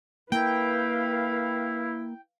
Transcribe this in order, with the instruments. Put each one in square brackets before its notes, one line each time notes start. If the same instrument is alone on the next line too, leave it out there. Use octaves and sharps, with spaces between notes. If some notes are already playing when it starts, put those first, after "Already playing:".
[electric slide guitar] A#3 A#4 [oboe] E4 [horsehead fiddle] B4 F5 [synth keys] G5